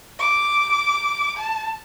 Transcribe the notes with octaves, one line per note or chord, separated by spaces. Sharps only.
D6
A5